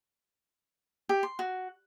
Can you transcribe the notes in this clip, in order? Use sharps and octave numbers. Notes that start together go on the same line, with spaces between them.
G4
C6
F#4